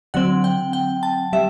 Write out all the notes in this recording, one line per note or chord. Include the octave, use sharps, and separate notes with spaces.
D3 F#3 C4 F#5
G5
G5
A5
G3 E5